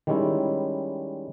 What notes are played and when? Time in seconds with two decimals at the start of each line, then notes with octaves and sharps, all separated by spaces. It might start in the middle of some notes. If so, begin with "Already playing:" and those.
0.07 D#3 G3 G#3 C#4 E4